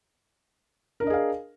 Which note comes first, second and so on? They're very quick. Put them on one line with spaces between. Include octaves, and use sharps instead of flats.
A#4 D4 D#5 G#4 F5